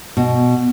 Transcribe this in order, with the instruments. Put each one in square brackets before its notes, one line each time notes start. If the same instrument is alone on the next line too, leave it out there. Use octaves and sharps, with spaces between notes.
[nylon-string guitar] B2